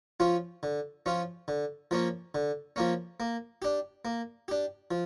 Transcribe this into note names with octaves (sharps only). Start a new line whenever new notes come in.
F3 C#4 F4
D3
F3 C#4 F4
D3
F3 A#3 C#4
D3
F3 A#3 C#4
A#3
D4 G4
A#3
D4 G4
F3